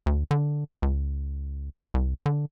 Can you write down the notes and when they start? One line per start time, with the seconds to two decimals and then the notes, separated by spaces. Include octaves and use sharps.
0.06 D2
0.31 D3
0.82 C#2
1.94 C2
2.26 D3